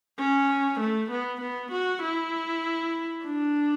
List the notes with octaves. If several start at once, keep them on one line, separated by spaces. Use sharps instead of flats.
C#4
A3
B3
B3
F#4
E4
D4